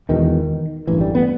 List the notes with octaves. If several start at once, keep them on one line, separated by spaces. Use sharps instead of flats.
E1 E2 B2 D#3
A1 G2 E3
G3
B3